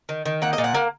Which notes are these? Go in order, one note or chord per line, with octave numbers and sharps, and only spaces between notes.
D#3
D#3
A#3 F#5
D#5
A#2
F#5
A#3